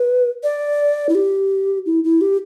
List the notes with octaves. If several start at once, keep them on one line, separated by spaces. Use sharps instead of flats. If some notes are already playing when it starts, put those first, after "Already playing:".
Already playing: B4
D5
E4
G4
E4
E4
G4